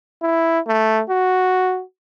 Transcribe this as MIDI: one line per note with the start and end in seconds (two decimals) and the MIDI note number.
0.22 0.59 64
0.67 1.01 57
1.10 1.82 66